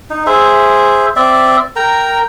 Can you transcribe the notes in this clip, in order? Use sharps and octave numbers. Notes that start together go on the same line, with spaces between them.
D#4
G#4 C5 E5
C4 D5 E5
A#4 G5 A#5